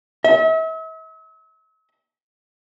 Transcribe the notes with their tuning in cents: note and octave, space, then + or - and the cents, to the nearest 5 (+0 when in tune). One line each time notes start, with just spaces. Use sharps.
E5 -40